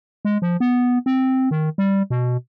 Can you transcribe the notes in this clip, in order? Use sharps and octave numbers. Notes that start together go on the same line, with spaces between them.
G#3
F3
B3
C4
D#3
G3
B2